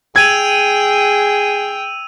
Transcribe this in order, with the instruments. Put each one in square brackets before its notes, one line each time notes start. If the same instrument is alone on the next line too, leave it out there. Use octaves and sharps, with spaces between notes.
[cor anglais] G#4 [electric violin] G5 [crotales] E6 D#7 F7 [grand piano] G#6